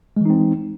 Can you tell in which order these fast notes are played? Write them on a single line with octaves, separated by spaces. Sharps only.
G#3 E3 D#4 C4